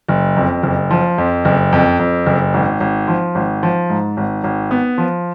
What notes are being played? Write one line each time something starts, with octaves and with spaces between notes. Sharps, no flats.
F#1
F2
F#1
F3
F2
F#1
F2
F2
F#1
G#1
G#1
F3
G#1
F3
G#2
G#1
G#1
B3
F3